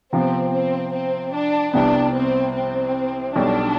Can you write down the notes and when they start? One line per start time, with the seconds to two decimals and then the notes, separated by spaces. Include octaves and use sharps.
0.13 C3 F3 B3 C4
0.53 C4
0.93 C4
1.33 D4
1.73 C2 C3 G3 B3 D4
2.14 C4
2.55 C4
3.35 B1 B2 G3 D4